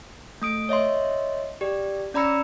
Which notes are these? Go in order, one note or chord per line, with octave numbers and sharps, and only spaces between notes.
A3 D#6 D7
C#5 D#5 E5 C6
G4 D5
C#4 D5 A#5 B5 E6 C#7